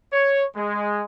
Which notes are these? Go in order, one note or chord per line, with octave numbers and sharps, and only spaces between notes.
C#5
G#3